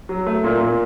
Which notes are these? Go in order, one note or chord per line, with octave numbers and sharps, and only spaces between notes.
F#3
A3
A#2
A#2